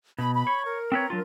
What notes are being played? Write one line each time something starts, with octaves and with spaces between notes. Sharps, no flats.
B2 B5
B5
C#5
A#4
C4 B4 C#5
F#3 D4 F4